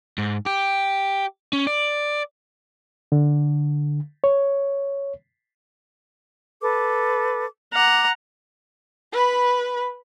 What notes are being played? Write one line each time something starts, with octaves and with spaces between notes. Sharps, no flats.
G#2
G4
C#4
D5
D3
C#5
A4 B4 D6
F#5 A#5 D6
B4 B5